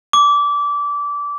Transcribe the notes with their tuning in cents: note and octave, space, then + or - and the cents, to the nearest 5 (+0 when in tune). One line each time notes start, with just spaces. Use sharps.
D6 -20